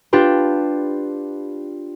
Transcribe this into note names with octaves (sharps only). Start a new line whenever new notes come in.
D4 F4 G4 B4